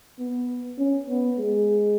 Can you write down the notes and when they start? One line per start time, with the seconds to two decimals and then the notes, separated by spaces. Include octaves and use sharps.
0.19 B3
0.78 C#4
1.09 B3
1.39 G#3